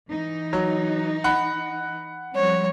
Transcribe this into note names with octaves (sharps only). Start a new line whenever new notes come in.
E3 D#4
F#3
F#5 B5
F3 G3 C4 C#5